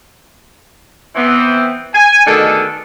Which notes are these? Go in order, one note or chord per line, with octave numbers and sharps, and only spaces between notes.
E3 B3 C4
G#5
B2 D3 D#3 A3 G#4 A4